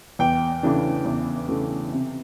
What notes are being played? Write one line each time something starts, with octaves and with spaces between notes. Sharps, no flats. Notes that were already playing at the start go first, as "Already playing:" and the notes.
E2 G5
C#3 E3 A3 D4
E2
C#3 E3 A3 D4
C3